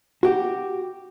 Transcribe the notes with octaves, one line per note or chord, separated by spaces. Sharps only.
F#4 G4